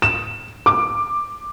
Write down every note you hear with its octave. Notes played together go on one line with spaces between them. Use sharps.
E7
D6